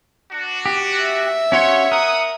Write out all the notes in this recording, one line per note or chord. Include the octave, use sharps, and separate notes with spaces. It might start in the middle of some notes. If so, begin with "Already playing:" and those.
D4 F#4
G4
E5
C#4 F#4 C5 C#5
A#4 F#5 D#6